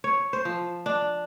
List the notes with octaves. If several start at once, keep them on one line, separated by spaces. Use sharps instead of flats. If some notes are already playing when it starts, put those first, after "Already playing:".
C#5
C5
F3
D4